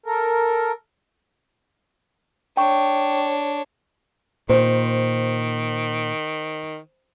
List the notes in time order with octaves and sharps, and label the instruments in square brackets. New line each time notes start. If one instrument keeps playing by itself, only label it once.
[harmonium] A4 A#4
[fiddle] D4 C#5 [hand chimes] G5 C#6
[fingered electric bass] A#2 [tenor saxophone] D#3 [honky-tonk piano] C5